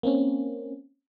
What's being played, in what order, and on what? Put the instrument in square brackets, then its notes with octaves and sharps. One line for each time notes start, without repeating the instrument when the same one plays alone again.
[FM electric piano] A#3 C4 C#4